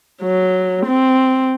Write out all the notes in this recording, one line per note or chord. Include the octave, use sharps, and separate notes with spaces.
F#3
C4